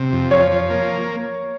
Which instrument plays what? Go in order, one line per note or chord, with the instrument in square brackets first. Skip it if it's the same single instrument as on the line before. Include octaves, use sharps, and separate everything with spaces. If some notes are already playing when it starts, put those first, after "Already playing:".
Already playing: [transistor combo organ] C3
F2
[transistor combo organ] F3 [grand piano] C#5
[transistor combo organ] F3
A#3